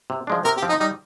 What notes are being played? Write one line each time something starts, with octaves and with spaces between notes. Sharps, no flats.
C3
F3 G#3 D4
C3 A#4
G4
F3 C4
D#4
G3 D#4